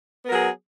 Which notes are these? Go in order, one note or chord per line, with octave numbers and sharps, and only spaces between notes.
F#3 B3 G#4 A#4